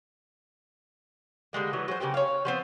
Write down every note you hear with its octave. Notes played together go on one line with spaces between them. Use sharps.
D3 G3 G#3 A#3
D3 E3 F#3
F#3 G#4 C5
C#3 A#3 C4 G4
C#5 F5
F3 B3 C4